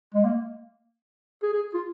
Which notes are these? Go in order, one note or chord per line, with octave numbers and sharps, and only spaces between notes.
G#3
A#3
G#4
G#4
F4